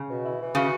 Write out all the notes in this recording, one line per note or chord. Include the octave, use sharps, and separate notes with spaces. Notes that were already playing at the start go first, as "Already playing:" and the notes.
Already playing: C#3
B2
E4
E3
C#3 F#4